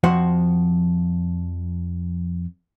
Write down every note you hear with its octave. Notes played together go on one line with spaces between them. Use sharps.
F2 F3 F#4 C5 F#5